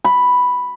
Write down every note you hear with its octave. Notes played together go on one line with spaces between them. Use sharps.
B5